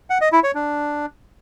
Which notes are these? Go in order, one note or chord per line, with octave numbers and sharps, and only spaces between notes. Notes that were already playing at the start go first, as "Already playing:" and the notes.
F#5
D#5
E4
C#5
D4